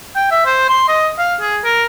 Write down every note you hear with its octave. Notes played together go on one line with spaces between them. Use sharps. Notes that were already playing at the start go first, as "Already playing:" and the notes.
G5
E5
C5
C6
D#5
F5
G#4
A#4